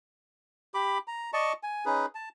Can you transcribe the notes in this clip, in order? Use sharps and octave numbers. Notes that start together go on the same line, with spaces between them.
G4 B5 D6
A#5
D5 D#5 A5 C#6
G#5
C#4 D#4 G#4 B4
A5